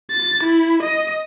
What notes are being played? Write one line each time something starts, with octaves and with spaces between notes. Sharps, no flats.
A6
E4
D#5